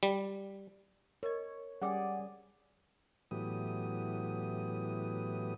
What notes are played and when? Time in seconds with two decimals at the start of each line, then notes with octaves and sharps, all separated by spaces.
0.03 G3
1.23 A#4 C#5 D#5
1.82 G3 C#4 G#4 D5 F#5 G5 D6 E6
3.31 A2 E3 F#3 B3 G4 D#6